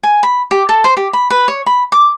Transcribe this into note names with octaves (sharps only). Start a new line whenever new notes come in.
G#5
B5
G4
A4
C5
G4
B5
B4
C#5
B5
D6